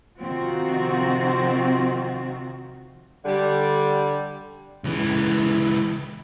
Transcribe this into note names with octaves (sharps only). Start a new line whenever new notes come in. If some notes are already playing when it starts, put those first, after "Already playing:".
C3 D#3 F3 C4 F4 F#4
D3 G3
C#2 E3